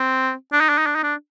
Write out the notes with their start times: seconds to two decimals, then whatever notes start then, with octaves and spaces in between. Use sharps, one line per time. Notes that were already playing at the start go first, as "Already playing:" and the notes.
Already playing: C4
0.52 D4
0.60 D#4
0.69 D4
0.78 D#4
0.86 D4
0.95 D#4
1.03 D4